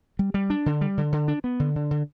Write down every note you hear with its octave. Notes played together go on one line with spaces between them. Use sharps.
G3
G3
D4
D3
G3
D3
D3
D4
B3
D3
D3
D3